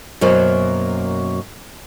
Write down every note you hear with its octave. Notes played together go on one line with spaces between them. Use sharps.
F#2 B2 F#3 A#3 C5